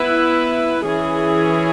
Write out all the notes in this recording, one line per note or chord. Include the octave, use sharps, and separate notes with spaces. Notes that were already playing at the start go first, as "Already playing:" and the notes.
Already playing: B3 E4 B4
E3 C#4 G#4